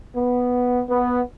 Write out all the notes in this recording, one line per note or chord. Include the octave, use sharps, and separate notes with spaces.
B3
B3